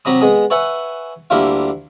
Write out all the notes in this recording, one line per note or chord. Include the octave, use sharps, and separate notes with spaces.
C3 F#3 A#5 B5 D#6
G#3 B3 G#4 D#6
B4 C#5 E5 F#5 G#5 C#6
D2 G3 A#3 E4 F4 F5